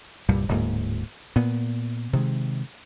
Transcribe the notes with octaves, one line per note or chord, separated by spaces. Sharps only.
C2 G2 A#2 G3
D1 D2 G#2 A#3
A#2 B3
C3 D#3 G#3